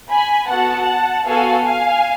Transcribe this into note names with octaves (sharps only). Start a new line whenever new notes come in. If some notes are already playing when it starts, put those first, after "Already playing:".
G#5 B5
B3 F#4 A4 F#5 A5
B3 F#4 A4 F5 G#5
F5 G#5